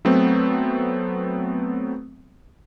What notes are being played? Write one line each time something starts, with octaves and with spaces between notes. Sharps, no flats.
F#3 A3 B3 C4